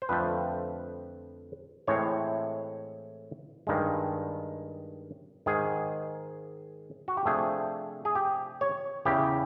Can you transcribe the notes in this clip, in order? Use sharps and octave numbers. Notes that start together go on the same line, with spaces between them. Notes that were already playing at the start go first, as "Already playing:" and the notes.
C5
F2 D3 F3 A3 C4 B4
A2 E3 G#3 C4 C#5
G2 D#3 G#3
G#2 D#3 G#3 G#4
F#4
G4
C3 F3 A3 D4 G#4
G#4
G4
C#5
E2 C#3 E3 G4